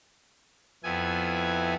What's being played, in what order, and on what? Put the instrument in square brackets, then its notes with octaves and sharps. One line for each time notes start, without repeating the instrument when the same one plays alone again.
[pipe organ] F2 B3 E4 G#5